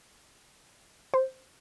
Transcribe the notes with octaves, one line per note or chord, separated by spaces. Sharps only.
C5